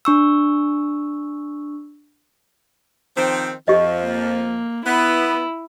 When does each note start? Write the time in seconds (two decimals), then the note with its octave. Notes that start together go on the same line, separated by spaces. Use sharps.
0.05 D4 C#6 E6
3.17 D#3 F3 C4
3.68 F2 F3 G4 D#5
4.04 A#3
4.86 B3 E4